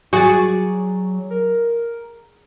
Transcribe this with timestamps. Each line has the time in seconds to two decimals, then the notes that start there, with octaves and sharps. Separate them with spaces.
0.13 F#3 F#4 G#4 D5
1.30 A#4